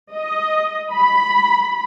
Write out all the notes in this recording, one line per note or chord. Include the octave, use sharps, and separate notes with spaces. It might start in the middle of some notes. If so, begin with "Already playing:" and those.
D#5
B5